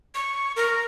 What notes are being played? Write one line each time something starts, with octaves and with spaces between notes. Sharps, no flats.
C#6
A#4